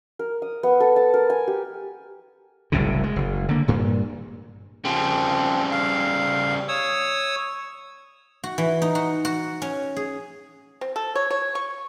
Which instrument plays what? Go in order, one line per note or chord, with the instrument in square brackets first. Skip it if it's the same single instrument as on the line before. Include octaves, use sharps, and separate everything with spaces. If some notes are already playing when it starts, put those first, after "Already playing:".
[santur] A#4
D#6
B3
A4
A5
A#4
G#5
G4
[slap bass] F#1 C2 A2 C#3
G#3
F#1
D3 A#3
G2 A#2
[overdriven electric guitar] C#3 G3 [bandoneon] F3 C4
[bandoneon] F5
C#5 D#6 E6
[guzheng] F#4
E3
D#4
F#4
F#4
C#4
G#4
[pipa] C4
A4
C#5
C#5
C#6